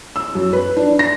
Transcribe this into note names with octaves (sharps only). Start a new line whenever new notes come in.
E6
F#2
B4
D4
A#6